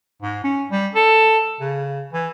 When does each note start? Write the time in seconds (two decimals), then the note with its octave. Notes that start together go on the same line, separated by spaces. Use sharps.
0.22 G#2
0.44 C#4
0.72 G3
0.95 A4
1.60 C#3
2.13 E3